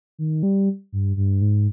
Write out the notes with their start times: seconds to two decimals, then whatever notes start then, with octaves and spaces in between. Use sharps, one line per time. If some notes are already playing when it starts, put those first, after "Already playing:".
0.18 D#3
0.43 G3
0.93 G2
1.17 G2
1.41 G#2